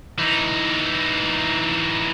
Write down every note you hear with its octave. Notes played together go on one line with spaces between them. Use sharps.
E3 D#4